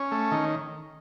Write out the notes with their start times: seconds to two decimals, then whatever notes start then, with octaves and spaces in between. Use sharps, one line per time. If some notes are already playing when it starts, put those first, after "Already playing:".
Already playing: C#4
0.11 A3
0.31 D#3